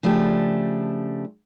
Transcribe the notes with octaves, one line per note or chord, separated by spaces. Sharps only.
C#3 F3 A3 D4 G4